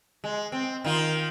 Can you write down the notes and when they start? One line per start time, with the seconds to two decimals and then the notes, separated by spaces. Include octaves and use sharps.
0.24 G#3
0.52 C4
0.84 D#3 D#4 F4